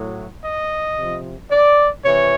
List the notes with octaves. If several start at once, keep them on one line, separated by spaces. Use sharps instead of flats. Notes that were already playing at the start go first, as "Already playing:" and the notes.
Already playing: A2 F#3
D#5
C3 F3
D5
C3 E3 C#5